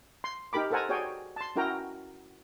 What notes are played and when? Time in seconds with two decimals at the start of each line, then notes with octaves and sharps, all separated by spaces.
0.24 C6
0.53 D#4 G4 A#4 B5 D6
0.71 A4 A#4 C5 F#5 G#5 A#5
0.89 F#4 G#4 C#5 D5 G5 G#5
1.36 A5 C6
1.56 C#4 E4 F#4 A#4 G5 A#5